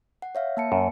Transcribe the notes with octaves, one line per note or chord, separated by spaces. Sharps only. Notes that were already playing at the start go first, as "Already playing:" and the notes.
F#5
C#5 E5 F5
A#3 A5 C#7
F#2